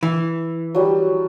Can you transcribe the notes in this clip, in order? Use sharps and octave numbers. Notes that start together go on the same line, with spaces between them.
E3
F#3 G3 A5